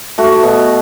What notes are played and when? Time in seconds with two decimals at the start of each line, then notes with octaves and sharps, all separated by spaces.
0.18 A3 F#4
0.43 B2